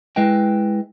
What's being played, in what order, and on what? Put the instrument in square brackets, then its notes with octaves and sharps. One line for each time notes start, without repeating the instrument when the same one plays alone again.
[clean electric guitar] G#3 E4 B4 D#5 G5